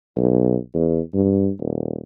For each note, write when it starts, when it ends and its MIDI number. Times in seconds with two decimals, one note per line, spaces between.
0.16 0.56 35
0.74 1.00 40
1.14 1.50 43
1.60 2.00 27